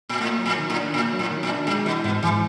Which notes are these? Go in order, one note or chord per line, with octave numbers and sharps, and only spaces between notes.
A#2
A2 A#3
F#3
A#2
D#3
A2
D4
A#2 A#3
F#3
A2
D#3
A#2
D4
A#2 G#3
B2 E3
G#2 B2
G#2 E3